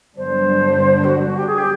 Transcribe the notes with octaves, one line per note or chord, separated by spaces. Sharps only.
G2 D3 F#3 B3 D4 C5
F#4
F#4
G4
G#4
G4